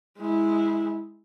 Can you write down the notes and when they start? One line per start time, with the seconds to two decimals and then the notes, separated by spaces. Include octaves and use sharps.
0.19 G#3 E4